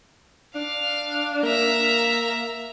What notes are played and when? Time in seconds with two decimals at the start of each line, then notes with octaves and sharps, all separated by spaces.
0.55 D4 F5
1.43 A#3 E5 A#5